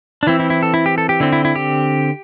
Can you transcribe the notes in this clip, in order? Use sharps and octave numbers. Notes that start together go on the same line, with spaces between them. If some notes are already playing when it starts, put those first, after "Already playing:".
D4
E3 C4 E4
E4
E4
A4
E4
G4
A4
G4
D3 C4 E4
E4
E4
G4